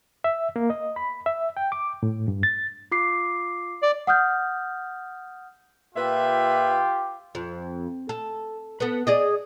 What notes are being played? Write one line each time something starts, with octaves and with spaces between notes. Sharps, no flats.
E5
A#3
D#5
B5
E5
G5
D6
A2
G2
A6
F4 D6 C7
D5
F#5 D#6 F6 G6
A#2 F4 G4 B4 E5
F2
A4
B3 A4
G#4 D5 D#5